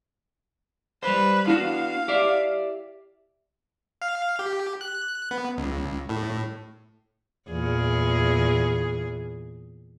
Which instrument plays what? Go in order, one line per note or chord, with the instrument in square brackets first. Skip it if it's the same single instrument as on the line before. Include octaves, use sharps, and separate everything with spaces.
[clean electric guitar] G3 C5 [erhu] B4
[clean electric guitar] B3 D4 F#4 [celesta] E4 [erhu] F5
[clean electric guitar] G4 D5 E5
[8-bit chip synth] F5
G4
F#6
B3
C#2
A2
[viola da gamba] E2 A#2 G#4